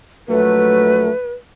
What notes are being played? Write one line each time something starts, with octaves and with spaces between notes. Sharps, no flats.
A#1 F#3 A3 B4